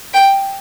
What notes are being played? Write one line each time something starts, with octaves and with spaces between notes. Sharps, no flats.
G5